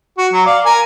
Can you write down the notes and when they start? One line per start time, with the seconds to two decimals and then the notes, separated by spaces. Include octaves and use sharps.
0.18 F#4
0.32 F#3
0.45 D5 F5
0.66 A#4 G#5 A#5